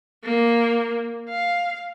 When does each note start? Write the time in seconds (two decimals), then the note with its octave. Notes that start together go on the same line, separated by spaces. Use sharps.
0.24 A#3
1.29 F5